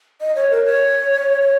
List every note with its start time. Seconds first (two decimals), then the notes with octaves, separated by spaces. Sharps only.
0.21 D#5
0.35 C#5
0.51 A#4
0.65 C#5
1.41 C#5